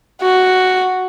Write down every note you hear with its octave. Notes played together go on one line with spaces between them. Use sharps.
F#4